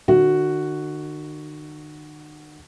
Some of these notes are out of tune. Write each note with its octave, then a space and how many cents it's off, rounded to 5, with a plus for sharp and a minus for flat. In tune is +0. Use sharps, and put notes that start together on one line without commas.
D#3 -45 F#4 +0